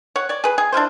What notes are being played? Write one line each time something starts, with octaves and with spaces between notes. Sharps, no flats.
C#5 F#5
C#5 D5
G#4 B4
G#4
D4 E4 F4 C5